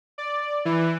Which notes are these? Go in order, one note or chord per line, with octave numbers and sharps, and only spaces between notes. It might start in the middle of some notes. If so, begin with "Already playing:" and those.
D5
E3